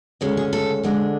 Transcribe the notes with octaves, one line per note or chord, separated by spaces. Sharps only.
D2 C#3 G#3 C#4
G#4
A4
D2 D3 G#3 D4